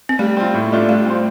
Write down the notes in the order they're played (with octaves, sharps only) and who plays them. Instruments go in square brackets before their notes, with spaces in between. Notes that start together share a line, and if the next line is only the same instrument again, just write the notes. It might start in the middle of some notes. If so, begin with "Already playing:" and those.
[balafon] C4
[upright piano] G3 [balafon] A3
[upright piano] C4 F4
A2
A3 D4 F4
[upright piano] G3 [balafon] A3
[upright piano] C4 G4 C5